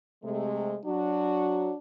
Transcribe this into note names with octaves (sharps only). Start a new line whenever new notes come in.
C3 G#3 A3
F#3 D4 F#4